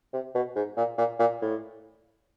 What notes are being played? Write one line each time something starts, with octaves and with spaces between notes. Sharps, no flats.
C3
B2
G#2
A#2
A#2
A#2
A2